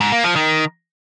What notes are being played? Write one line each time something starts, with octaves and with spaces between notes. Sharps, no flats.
G#2
A#3
F3
D#3